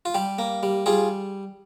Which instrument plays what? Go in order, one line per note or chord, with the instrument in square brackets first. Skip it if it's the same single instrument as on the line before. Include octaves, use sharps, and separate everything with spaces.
[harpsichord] F4
G3 G4
A#3
G3
G3 F4 G#4